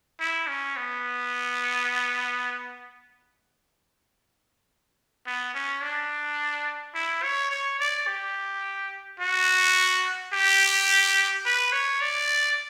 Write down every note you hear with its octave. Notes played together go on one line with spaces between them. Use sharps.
E4
C#4
B3
B3
C#4
D4
E4
C#5
C#5
D5
G4
F#4
G4
B4
C#5
D5